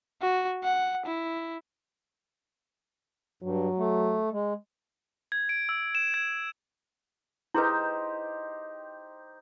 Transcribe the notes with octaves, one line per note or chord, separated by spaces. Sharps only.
F#4
F#5
E4
G2 F#3
A3
G#3
G#6
D7
E6
E7
G#6
D#4 E4 G4 G#4 B4 C5